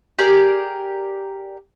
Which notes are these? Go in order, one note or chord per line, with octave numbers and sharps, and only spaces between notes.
G4 G#4 A#4 D5